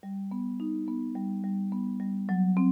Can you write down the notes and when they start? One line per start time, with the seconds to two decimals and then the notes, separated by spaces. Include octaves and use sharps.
0.03 G3
0.31 B3
0.60 D#4
0.88 B3
1.15 G3
1.44 G3
1.72 B3
2.00 G3
2.29 F#3
2.57 C4